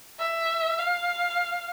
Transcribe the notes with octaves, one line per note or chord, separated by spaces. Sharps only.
E5
F5